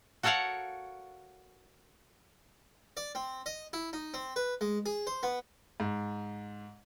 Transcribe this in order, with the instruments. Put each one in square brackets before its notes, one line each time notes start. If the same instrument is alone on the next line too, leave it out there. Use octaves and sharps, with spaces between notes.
[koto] F#4 A4 A#4 C#5 F5 F#5
[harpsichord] D5
C4
D#5
E4
D#4
C4
B4
G#3
G#4
C5
B3
[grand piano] G#2